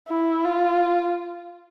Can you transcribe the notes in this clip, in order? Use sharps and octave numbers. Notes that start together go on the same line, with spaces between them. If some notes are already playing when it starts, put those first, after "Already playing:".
E4
F4